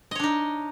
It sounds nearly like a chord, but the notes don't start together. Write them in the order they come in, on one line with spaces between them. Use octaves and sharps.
D#5 C#5 D4 D#4